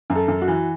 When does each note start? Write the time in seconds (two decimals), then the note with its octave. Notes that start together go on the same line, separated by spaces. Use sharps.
0.10 F#2
0.15 A4
0.28 F#2
0.42 F#4
0.48 E3